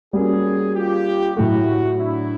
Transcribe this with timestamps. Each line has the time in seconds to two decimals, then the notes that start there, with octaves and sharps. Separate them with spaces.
0.13 G3 A#3 C#4 F#4 G#4
0.75 F4 G4
1.36 A2 F#3 A3 E4 F#4
1.98 D4 E4